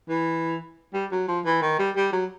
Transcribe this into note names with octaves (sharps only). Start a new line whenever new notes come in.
E3
G3
F#3
F3
E3
D#3
G3
G3
F#3